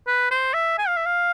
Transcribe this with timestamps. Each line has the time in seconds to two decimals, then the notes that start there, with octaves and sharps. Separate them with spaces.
0.07 B4
0.31 C5
0.54 E5
0.78 G#5
0.88 F5
0.97 E5
1.06 F5